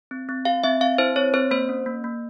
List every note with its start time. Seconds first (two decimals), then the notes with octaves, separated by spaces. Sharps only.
0.11 C4
0.29 C4
0.45 G4 F5
0.64 C4 E5
0.81 C4 F5
0.98 E4 C5
1.16 C4 C#5
1.34 C4 C5
1.51 A#3 C5
1.69 C#4
1.86 A#3
2.04 A#3